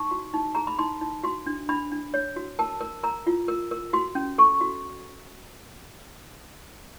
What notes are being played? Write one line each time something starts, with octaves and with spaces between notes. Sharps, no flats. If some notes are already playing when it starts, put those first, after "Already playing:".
Already playing: D#4 C#6
F#4
D#4
G#4 A#5
B5
D#4 C6
D#4
F#4 C6
D4
D4 B5
D4
C#5
F#4
A#4 A5
A#4
A#4 A#5
F4
A#4
A#4
F#4 C6
C#4
A4 C#6
F#4